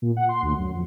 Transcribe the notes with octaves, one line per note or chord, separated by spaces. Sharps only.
A#2
F#5
C6
D2
F#2
F2